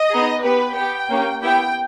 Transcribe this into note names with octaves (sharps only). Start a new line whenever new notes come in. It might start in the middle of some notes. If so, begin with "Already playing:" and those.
Already playing: D#5
B3 D#4 G#4
B3 G4 B4
B3 G4 G5
A#3 C#4 G4
B3 E4 G4 G5